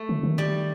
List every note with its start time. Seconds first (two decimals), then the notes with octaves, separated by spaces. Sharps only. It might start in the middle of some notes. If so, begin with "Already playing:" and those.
Already playing: A3
0.09 D3
0.23 D#3
0.38 G3